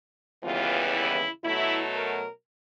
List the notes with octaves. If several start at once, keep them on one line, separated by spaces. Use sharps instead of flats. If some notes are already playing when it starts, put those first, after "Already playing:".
D#2 C#3 E3 G3 B3 F4
E4
B2 F#3 A3 E4
A#4